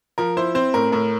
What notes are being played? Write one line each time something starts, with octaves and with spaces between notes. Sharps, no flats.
F3 A#4
E4 C5
C4 C5
A2 A#4
A2 A#4